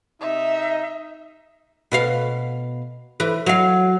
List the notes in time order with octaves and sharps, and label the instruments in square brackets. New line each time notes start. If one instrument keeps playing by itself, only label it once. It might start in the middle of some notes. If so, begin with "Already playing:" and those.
[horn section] C3 D#4 [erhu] E5
[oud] B2 B4 F5
E3 B4
F#3 F5